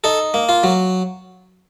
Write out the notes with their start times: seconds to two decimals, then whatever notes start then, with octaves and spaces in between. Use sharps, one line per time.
0.04 D#4 A4
0.34 A#3
0.49 F4
0.63 F#3